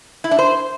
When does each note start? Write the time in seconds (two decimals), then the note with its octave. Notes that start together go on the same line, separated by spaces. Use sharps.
0.24 E4
0.31 D4
0.39 C5